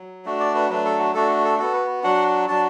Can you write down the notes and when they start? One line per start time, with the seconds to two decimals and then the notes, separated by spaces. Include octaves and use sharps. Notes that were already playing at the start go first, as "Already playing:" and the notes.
Already playing: F#3
0.25 A3 D4 F#4
0.40 D5
0.55 B4
0.70 F#3 A3 D4 B4
0.85 A4
0.99 F#4
1.14 A3 D4 F#4 A4
1.45 A4
1.58 B3 F#4 A4
1.73 B4
2.03 F#3 D4 F#4 F#5
2.48 F#3 D4 F#4 A5